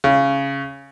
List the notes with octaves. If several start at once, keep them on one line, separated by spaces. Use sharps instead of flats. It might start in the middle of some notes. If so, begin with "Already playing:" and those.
C#3